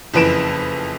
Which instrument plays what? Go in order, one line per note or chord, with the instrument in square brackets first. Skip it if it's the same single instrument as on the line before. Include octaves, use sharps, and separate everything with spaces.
[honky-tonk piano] F#1 F2 E3 B4 D7 E7